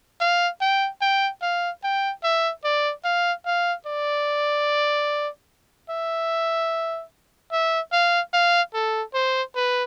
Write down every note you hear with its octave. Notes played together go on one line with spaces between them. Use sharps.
F5
G5
G5
F5
G5
E5
D5
F5
F5
D5
E5
E5
F5
F5
A4
C5
B4